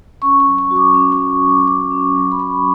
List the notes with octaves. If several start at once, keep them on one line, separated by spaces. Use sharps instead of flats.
C#4 C#6
C#6
F#3
C#6
F#4
D6
C#4 C#6
C#6
F#4
F#3
D6
F#3 D6
C#4
F#3
B5
F#3 C#6